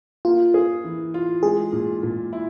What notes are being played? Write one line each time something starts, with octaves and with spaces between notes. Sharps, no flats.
A#3 F4
G#4
E3
F4
G#3 G#4
A#2
A#2
E4